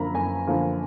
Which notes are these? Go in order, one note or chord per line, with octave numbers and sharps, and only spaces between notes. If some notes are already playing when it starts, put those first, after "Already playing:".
Already playing: F#2 D3 F3 A#3 A#5 B5
F#2 G#5
D3 F3 A#3